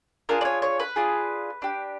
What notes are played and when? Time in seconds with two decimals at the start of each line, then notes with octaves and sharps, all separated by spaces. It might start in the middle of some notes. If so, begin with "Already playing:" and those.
0.29 D4 F4 G#4 A#4
0.41 D5
0.45 C#5
0.62 C#5
0.80 B4
0.96 D4 F4 G#4
1.62 D4 G4